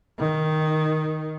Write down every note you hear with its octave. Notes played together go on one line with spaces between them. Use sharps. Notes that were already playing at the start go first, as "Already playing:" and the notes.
D#3